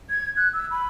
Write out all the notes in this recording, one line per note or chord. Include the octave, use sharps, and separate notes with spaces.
G#6
F#6
E6
B5